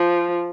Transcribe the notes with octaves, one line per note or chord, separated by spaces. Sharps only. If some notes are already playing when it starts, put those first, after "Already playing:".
Already playing: F3